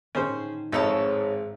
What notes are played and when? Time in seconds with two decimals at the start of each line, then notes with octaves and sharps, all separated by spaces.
0.15 A2 D#3 C#4 G#4 C5
0.72 G#1 F2 G#2 A4 C#5 D#5 A5